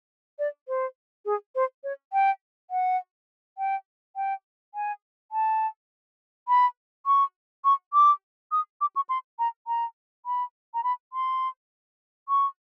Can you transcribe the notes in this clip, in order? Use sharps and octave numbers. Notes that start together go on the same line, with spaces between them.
D5
C5
G#4
C5
C#5
G5
F#5
G5
G5
G#5
A5
B5
C#6
C#6
D6
D#6
D6
C#6
C6
A#5
A#5
B5
A#5
B5
C6
C#6